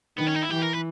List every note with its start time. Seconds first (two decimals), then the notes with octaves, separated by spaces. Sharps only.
0.18 D#3 B3
0.27 C#4
0.35 D#4
0.43 E4
0.50 E3 G4
0.62 A#4
0.73 B4